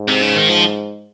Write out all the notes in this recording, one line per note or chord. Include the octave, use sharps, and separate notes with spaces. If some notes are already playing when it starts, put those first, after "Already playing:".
Already playing: G#2
C3
C#3
D#3
F3